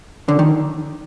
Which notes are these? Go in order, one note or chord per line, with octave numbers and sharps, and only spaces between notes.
D3
D#3